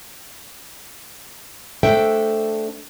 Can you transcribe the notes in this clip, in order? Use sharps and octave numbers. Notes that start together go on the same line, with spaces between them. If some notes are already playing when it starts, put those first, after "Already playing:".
A3 D4 A4 C5 E5 G5